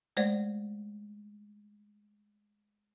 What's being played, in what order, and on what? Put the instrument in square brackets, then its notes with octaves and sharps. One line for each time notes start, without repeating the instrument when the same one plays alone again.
[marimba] G#3 A3 C5 D5